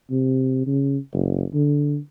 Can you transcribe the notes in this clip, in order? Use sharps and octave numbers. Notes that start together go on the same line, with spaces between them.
C3
C#3
F#1
D3